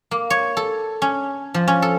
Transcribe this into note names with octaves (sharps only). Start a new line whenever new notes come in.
A#3
C#5
A4
C#4
F3
C#4
A4